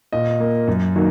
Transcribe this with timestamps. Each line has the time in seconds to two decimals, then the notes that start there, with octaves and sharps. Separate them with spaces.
0.13 A#2 D#5
0.40 A#3
0.68 F#2
0.95 D#3 F#3 A#3